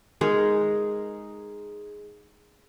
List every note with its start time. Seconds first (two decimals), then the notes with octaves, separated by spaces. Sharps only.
0.21 G#3 D#4 G#4 A#4